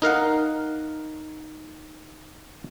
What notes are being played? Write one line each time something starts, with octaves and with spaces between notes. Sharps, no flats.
D#4 A#4 F5 F#5